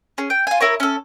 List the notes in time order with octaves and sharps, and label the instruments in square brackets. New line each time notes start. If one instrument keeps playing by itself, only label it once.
[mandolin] C#4 G#4
G5
F4 G#5
E4 A#4 C#5
C#4 A4